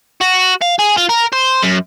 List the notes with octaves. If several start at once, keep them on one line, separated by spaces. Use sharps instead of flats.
F#4
F5
G#4
F4
A#4
C5
F#2